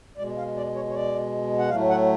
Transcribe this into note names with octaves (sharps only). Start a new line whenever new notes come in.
B2 G#3 D5
F5
D5
C#5
C#5
D5
F#5
A2 F#3 A3 F5
F#5